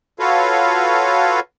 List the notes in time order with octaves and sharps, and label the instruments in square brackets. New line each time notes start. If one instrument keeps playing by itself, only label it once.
[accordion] F4 F#4 A4 B4 C#5 F5